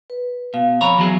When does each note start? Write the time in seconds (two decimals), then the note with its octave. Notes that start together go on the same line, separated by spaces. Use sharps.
0.10 B4
0.54 B2 F5
0.81 F2 C#5 A#5 B5
0.98 E2 F#3 G#4